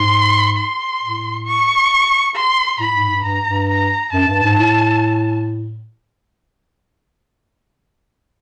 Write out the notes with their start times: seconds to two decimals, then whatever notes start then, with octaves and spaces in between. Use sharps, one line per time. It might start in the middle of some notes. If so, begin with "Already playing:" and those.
Already playing: G#2 C6
0.57 C6
1.02 A2
1.46 C#6
2.36 C6
2.79 A2 B5
2.95 G#2
3.09 G2
3.24 G2 A#5
3.46 G2
3.68 A#5
4.12 F#2 A5
4.28 G2
4.43 G#2
4.58 A2